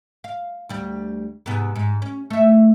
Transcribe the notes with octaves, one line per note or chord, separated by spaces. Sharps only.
F5
D2 G3
G#2 C3 B3
G#2
C#4
A3 E5